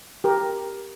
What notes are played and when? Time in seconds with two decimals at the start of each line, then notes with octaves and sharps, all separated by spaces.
0.24 G4 A#4